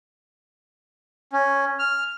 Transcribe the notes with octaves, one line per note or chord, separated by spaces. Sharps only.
C#4
F6